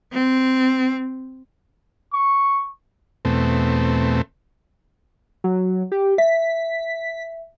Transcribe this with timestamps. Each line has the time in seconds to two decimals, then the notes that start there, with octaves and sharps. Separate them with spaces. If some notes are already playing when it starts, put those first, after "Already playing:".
0.13 C4
2.13 C#6
3.25 E2 B2 A3 C4
5.44 F#3
5.92 G4
6.18 E5 B6